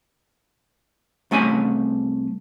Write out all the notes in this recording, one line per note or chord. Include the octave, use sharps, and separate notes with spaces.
C2 A3 C#4 G#5 B5